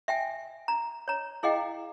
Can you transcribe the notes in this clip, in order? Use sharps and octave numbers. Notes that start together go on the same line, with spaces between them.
E5 G5 G#5
A#5
C#5 A#5
E4 G#4 D#5 F5 G5